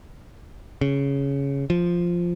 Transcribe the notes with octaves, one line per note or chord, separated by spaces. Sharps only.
C#3
F3